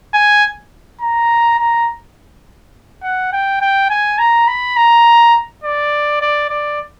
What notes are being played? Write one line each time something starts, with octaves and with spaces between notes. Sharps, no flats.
G#5
A#5
A#5
F#5
G5
G5
G#5
A#5
B5
A#5
D5
D5
D5